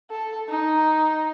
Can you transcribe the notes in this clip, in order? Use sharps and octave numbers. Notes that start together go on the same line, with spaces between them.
A4
D#4